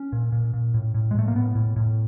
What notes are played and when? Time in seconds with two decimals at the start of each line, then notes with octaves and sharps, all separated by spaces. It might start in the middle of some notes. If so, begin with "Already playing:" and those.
Already playing: C#4
0.12 A#2
0.32 A#2
0.54 A#2
0.74 A2
0.95 A2
1.11 G#3
1.15 A2 A3
1.28 A#3
1.35 A2 B3
1.55 A2
1.76 A2